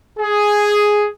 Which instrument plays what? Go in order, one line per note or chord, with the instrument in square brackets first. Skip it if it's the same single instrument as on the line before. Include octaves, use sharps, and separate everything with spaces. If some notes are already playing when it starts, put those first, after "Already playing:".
[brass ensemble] G#4